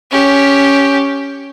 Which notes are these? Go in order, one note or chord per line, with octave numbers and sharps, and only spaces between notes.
C#4 G4